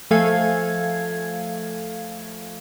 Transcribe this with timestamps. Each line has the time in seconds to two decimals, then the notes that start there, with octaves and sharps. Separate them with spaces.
0.11 F3 A3 A4 F5 G#5 G#6